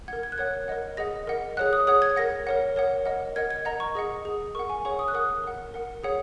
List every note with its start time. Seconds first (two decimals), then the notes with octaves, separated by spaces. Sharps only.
0.08 A#4 F#5 G#6
0.23 G#6
0.32 F#6
0.38 A#4 C#5 F#5 G#6
0.68 A#4 D#5 F#5
0.97 G#4 D#5 F#5 A#6
1.27 A#4 D#5 F#5
1.57 G#4 C#5 F#5 F#6
1.73 D#6
1.87 G#4 C#5 F#5 D#6
2.02 G#6
2.16 A#4 F#5 A#6
2.47 A#4 C#5 F#5
2.76 A#4 C#5 F#5
3.05 A#4 D#5 F#5
3.36 A#4 D#5 F#5 G#6
3.51 G#6
3.65 A#4 D#5 F#5 A#5
3.80 C#6
3.95 G#4 D#5 F#5
4.25 G#4 F#5
4.55 A#4 F#5 C#6
4.70 G#5
4.85 G#4 C#5 F#5 C#6
4.99 D#6
5.08 F#6
5.14 A#4 F#5 D#6
5.44 A#4 F#5
5.74 A#4 F#5
6.04 G#4 C#5 F#5